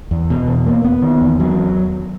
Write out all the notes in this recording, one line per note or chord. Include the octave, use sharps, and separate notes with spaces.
E2
B2
E2
A#3
B3
D#3
E2
F#3